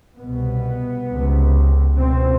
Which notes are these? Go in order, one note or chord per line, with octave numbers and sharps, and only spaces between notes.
C2 B2 B3
C#2 C3
C#2 B2 C4